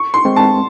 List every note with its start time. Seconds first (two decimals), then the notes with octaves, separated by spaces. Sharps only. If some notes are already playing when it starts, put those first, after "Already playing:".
Already playing: C#6
0.14 C6
0.25 G#3 C4
0.36 A5